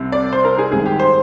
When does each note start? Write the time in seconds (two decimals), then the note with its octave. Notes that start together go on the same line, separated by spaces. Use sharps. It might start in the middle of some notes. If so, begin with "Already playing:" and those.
Already playing: C2 C3
0.12 D5
0.32 C5
0.45 A#4
0.58 G#4
0.72 G#1 G#2 G3 G#4
0.86 G4
0.99 C5